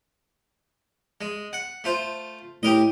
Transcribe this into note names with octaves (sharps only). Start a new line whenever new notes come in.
G#3
F#5
A3 F4 C5
A2 G4 A#4 D#5